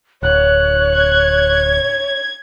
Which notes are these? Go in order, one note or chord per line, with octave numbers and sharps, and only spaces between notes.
D1 C#5 F#6
G#6